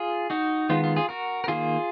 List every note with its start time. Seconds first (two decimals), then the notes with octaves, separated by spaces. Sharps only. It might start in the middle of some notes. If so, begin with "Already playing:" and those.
Already playing: F4 G#4
0.30 D#4 F#4
0.70 D#3 G#3 B3 F4
0.84 F4
0.96 F4 G#4
1.09 F#4 A#4
1.44 A#4
1.48 D#3 A#3 F4 G#4